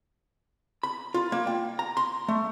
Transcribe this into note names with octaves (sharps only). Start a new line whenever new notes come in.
B5
F4
A#3
G5
A#5
C6
A3